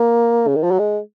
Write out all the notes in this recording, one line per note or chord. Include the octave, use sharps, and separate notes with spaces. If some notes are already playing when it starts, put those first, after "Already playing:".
Already playing: A#3
C#3
D#3
F3
F#3
G#3